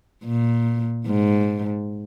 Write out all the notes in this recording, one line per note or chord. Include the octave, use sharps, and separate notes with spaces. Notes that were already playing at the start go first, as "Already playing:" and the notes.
A#2
G#2